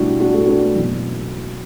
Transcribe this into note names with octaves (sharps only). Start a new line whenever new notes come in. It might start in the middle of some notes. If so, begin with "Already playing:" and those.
Already playing: C2 B2 D4 E4 F#4 G4
D4 F#4
F#4 A4
D4 F#4
F#1 E2 B2